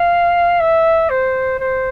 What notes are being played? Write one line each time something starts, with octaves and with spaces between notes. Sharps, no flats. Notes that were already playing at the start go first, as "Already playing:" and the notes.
Already playing: F5
E5
C5
C5